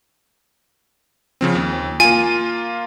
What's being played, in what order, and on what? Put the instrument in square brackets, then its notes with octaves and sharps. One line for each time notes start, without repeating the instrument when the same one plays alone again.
[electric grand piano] C#3 F3 C4
D#2
[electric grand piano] A#3 F4 [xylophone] G#5